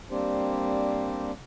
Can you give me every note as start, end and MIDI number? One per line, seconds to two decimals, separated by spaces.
0.11 1.31 55
0.11 1.31 58
0.11 1.31 60
0.11 1.31 62
0.11 1.31 67
0.11 1.31 72